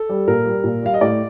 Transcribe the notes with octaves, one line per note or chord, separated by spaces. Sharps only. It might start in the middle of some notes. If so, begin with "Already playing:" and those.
Already playing: A4
G3
A#2 A#4
G3
A#2
G3 F5
D#5
A2 D5